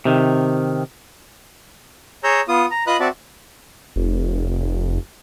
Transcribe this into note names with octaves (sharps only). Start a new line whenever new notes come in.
C3 D#3
G#4 C#5 A#5 E6 G6
B3 F4 D#6
A#5
F4 B4 D#5 B5 D#6 F#6
C4 F#4 D5 E5 A5
F1